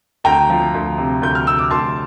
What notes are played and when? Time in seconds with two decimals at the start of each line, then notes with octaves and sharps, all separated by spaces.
0.24 D2 G5 A#5
0.49 F3
0.74 D2
0.98 C3
1.22 D2 G6
1.35 F6
1.46 C3 E6
1.58 D6
1.70 D2 A5 C6